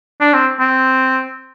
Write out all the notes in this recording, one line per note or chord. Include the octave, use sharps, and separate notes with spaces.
D4
C4
C4